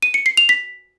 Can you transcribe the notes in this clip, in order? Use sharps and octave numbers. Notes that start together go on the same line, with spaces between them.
D#7
C#7
C7
F7
B6